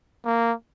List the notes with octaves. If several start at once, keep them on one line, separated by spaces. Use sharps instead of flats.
A#3